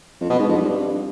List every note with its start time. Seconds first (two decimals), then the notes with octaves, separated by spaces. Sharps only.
0.21 F2
0.30 B2
0.39 G#2
0.48 F2
0.58 G2